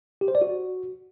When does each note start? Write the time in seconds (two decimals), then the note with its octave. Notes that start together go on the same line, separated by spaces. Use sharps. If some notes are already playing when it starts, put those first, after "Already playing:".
0.21 G4
0.28 C5
0.35 D5
0.42 F#4